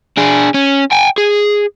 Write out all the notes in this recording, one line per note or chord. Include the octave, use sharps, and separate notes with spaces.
D4 G#4
C#4
G5 G#5
G#4